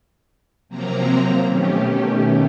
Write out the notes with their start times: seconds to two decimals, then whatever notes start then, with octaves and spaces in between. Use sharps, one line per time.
0.69 C3 F3 F#3 A#3 C4 A#5
1.44 B2 D#3 A3 C#4 G4